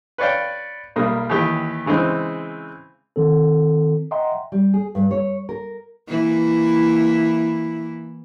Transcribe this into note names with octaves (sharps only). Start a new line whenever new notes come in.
B4 C#5 D5 F5 G5
B1 G3 A#3 D#6
D#2 E3 G4
C#3 E3 G#3 C4
D#3 C4 A4
D#5 E5 F#5 G5 A#5 C6
G3
G#4
G2
C#5
A#4
E3 A#3 E4